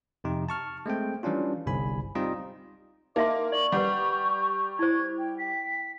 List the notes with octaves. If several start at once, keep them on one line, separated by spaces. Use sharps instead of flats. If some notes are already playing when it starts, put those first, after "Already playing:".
F2 C3 D#4
A5 C#6 F6
G#3 A3 C4 G5
E3 G3 C#4 D4 F4
G1 C2 G#5 B5
G3 C4 D#4 F4 D#5
A#3 D#4 D#5 E5 C6 D6
D5 C#6 F#7
G3 B4 F#5 G6
E4 C5 G#6
G5
G5 B6